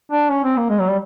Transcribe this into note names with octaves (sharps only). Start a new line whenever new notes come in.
D4
C#4
C4
A#3
G#3
F#3
G3